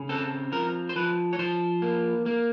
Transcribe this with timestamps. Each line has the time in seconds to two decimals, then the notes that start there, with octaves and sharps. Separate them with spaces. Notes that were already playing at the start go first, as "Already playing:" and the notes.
Already playing: C#3
0.09 C4 A4
0.52 F3 A#4
0.89 C5
0.96 F3 B4
1.33 C#5
1.39 F3 C5
1.82 A#3
2.26 A#3